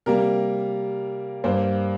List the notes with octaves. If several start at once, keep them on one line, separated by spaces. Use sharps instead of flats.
C3 G3 A#3 A#4
G2 G3 A#3 C5